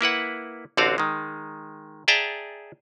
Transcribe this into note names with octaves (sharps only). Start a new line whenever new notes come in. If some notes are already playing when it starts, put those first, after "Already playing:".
A#3 E4 B4 F#5
A1 D3 C4 F#4 D5 F5
D#3 G#3
G#4 D5 E5 G5 A5 A#5